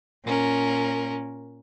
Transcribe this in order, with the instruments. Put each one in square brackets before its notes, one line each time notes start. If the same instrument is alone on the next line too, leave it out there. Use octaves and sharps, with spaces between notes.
[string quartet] A#2 C#4 A#4